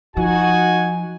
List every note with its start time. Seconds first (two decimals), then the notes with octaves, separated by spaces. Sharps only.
0.17 F3 D#4 F#4 G#5